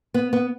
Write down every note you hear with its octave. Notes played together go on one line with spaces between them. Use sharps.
B3
B3